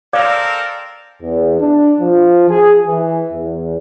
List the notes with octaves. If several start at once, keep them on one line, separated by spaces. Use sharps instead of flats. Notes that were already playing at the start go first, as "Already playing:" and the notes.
C4 A4 A#4 D5 F5 D6
E2
D4
F3
G#4
E3
E2